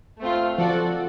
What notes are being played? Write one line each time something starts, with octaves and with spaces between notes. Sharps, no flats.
A3 C4 F4
F3 F#4 A4 D5 F#5